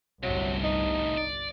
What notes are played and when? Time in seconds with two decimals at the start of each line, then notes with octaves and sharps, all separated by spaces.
0.23 G1 C2 A2 C3 F#3
0.63 D#4
1.17 D5